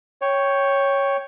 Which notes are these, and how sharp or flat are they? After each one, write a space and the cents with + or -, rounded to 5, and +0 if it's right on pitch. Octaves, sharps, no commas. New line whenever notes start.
C#5 +0 G5 +0